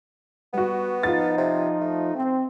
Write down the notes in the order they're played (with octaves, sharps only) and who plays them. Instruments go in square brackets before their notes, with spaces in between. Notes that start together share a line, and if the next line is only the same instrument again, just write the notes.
[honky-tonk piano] G3 F#4 [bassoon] B3
[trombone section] F3 D#4 [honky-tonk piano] F4 A6
[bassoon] C3
A3
[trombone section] C4